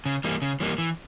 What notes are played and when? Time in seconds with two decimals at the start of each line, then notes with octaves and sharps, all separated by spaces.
0.06 C#3
0.24 E3 G3 A#3
0.42 C#3
0.60 E3 G3 A#3
0.78 E3